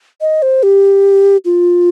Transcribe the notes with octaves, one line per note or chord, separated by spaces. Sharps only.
D#5
C5
G4
F4